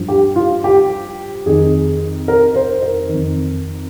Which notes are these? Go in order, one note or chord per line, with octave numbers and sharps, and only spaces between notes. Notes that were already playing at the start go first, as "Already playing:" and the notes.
Already playing: G2 F3
G4
F4
G4
F2 D#3 G#4
A#4
C5
A#4
F2 D#3